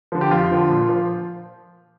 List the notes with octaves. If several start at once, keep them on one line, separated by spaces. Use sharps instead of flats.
D3 F3
G4
F2 F4
D3 F3
A#2
F3